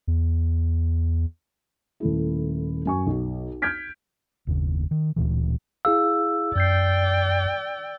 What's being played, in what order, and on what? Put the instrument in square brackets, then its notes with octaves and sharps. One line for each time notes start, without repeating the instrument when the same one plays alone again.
[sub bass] E2
[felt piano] D#1 A3 E4
F#2 G#5 C#6
B1
F6 G6 G#6 B6 D7
[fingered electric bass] F#1 D#2 C#3
D#3
D1 D2 A#2 E3
[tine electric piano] E4 G#4 F5 [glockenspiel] E6
[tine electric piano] F#2 G6 C7 [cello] D5 G5